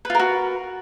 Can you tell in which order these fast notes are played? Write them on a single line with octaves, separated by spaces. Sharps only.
B4 F4 A#4 F#4